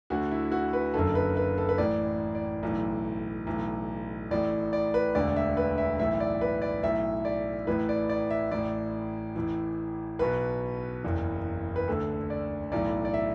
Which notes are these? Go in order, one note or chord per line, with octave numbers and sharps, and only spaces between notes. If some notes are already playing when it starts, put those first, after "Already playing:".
D2 D3 F#4
E4
F#4
B4
F#1 F#2 D3 A4
B4
B4
A4
B4
A1 A2 E3 D5
D5
B1 A2 E3
B1 A2 E3
A1 A2 E3 D5
D5
B4
E1 D2 D3 D5
E5
B4
E5
B1 A2 E3 E5
D5
B4
D5
B1 A2 E3 E5
D5
A1 A2 E3 B4
D5
D5
E5
A1 A2 E3 D5
A1 A2 E3
B1 B2 B4
F#1 E2 E3
B4
D2 D3 A4
D5
B1 A2 E3 D5
D5
E5